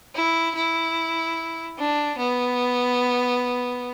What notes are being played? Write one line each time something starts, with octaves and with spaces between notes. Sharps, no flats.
E4
E4
D4
B3